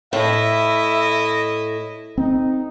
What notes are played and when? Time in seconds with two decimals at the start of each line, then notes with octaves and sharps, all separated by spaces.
0.13 A2 E4 D#5 E5
2.18 C4 D#4